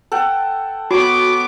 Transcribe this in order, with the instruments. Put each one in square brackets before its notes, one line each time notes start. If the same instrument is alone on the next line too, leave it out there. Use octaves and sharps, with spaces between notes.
[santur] A4 F#5 G5
[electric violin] B3 D6 [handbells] F#4 [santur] C#5